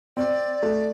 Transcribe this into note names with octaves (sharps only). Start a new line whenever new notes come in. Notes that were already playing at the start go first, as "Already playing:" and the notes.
C4 D5
A3